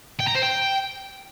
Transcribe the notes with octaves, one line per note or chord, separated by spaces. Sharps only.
G5
A#5
C5
G5